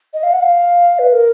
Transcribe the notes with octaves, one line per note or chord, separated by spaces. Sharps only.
D#5
F5
F#5
F5
B4
A#4